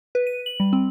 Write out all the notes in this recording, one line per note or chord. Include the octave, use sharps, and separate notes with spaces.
B4
D#7
F#7
G3
C4